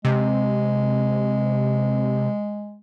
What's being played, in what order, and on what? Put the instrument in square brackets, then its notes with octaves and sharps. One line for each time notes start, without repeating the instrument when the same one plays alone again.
[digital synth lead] C3 [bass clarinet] G#3